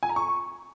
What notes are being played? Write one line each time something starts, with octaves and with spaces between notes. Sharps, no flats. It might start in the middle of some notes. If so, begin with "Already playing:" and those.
G#5
A#5
C#6